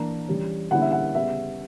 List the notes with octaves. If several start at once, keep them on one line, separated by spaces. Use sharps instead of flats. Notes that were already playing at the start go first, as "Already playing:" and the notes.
Already playing: E3 A#3 D4 A#5
E3 G3 C#4
D3 G3 A#3 C#4 E4 F#5
E5
F#5
C#3 G3 B3 E5